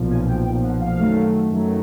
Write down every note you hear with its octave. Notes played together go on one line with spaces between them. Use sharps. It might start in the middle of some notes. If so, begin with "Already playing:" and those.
Already playing: B1 A#2 F3
G#5
G5
B1 A#2 F3 G5
F#5
F5
F#2 D#3 F#3 A3
F#2 D#3 F#3 A3